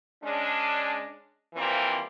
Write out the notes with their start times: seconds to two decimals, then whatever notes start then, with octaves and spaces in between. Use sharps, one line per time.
0.23 G#3 C#4 D4
1.55 E3 F3 G3 A#3 C4